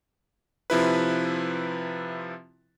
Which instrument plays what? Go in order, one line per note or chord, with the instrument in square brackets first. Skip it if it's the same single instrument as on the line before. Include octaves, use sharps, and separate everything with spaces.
[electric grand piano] C3 F3 E4 B4